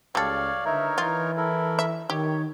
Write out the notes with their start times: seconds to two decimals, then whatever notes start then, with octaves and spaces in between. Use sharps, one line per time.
0.15 C#2 G3 A4 C#5 D5 F5
0.65 D3 D#4 A#4 B4 C#5 E5
0.98 E3 F4
1.37 E4 A4 A#4
1.79 E5
2.10 D#3 G4 C#5